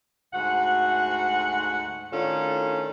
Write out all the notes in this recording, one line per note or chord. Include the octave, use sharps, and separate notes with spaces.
D2 G#2 F#4 F#5
A2 D#3 C#4 D4 F4 A4